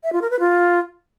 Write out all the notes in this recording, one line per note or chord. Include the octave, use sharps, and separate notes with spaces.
E5
F4
A#4
B4
F4